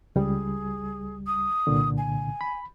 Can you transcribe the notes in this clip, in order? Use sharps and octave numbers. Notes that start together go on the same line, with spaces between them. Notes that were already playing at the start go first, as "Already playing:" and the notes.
C#2 G3 G#4
D#6
C2 A#2 D3
G#5
B5